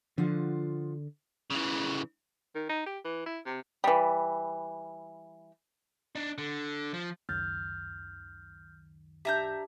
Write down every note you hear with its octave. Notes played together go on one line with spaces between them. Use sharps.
D3 F3 F4 F#5
C#3 E3
D#3
D#4
G4
E3
E4
C3
E3 G3
D4 D#4
D3
F3
C#2 F#2 D#3 F6 G6 A6
D4 G4 E5 A#5 G6